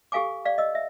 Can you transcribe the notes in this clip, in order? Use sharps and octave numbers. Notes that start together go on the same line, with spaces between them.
G4 A4 F5 G#5 D6
D5 F5
D#5 E6
E5